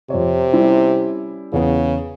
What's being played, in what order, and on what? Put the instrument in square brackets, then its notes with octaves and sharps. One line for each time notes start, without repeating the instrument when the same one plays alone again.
[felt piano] F2 C#5 [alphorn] C3
[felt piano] G3 C#4 E4
[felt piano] E2 B3 [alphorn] C#3